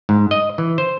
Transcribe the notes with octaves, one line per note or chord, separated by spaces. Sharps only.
G#2
D#5
E3
C5